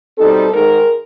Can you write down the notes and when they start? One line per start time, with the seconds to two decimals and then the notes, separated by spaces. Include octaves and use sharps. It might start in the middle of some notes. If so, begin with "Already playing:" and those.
0.17 B2 G3 C4 D#4 A4
0.52 G#2 D#3 G#3 A#4